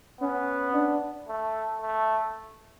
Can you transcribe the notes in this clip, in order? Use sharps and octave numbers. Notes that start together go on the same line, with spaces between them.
B3 C#4
D4
A3
A3